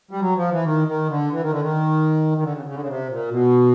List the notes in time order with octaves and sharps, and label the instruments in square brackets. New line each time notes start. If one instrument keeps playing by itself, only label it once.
[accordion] G3
F#3
F3
E3
D#3
D#3
D3
E3
D#3
D3
D#3
D#3
D3
C#3
C#3
D3
C#3
C3
A#2
B2